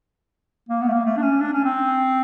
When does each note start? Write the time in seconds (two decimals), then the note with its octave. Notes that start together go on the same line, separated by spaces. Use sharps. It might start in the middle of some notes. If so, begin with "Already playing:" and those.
0.69 A#3
0.82 B3
0.88 A3
0.93 A#3
1.05 A3
1.17 D4
1.22 C#4
1.40 D4
1.53 C#4
1.65 C4